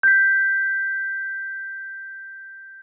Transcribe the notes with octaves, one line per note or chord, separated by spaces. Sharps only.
G6 B6